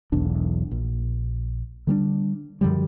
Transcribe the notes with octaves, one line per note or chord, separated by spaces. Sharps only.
E1 B1 E2 D4
A#1
D3 G3 A3 D4
F#2 D3 F3 G3